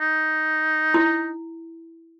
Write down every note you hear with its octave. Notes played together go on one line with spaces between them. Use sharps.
D#4
E4